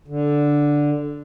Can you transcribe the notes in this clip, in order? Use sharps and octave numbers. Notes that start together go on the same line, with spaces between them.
D3